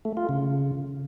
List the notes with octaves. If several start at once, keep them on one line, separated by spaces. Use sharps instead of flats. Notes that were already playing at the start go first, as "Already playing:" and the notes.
A3
F4
C#3